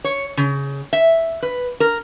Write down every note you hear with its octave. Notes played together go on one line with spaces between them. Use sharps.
C#5
C#3
E5
B4
A#4